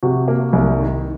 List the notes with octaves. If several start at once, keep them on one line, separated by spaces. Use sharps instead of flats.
C3 F#4
A#3
C2
D#3